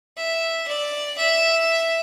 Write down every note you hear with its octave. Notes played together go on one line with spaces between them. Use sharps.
E5
D5
E5